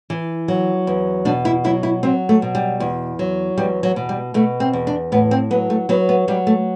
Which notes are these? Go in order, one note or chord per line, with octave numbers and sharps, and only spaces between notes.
E3
F#3
E2
B2 D4
E4
F#3 E4
E4
F#3 C4
A3
B2
G3
E2
F#3
E2 G3
F#3
B2
G3
B2 A3
C4
E2
D4
A2 B3
C4
F#3 B3
A3
F#3 B3
B3
F#3 G3
A3